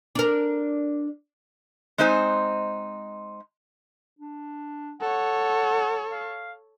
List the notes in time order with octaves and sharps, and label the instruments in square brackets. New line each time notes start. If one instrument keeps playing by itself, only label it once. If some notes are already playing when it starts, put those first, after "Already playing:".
[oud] D4 A#4
[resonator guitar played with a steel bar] G#3 C4 D#4 C5 G#5
[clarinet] D4
[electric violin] A4 C#5 [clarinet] F#5
[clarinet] F5